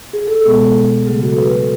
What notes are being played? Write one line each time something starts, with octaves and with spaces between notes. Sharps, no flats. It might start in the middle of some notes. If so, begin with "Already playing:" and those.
G#4
A4
G#4
B2 G#3 B3
C#3 F#3 A3 G#4
F#4 A4
G#4 B4
F#4 A4